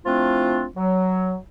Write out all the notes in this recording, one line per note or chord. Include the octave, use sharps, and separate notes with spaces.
F3 A3 C4 D4 E4 F4
F#3